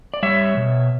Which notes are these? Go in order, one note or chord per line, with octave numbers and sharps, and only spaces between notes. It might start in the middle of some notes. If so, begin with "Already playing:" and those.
D5
G3 C#5 E5
B2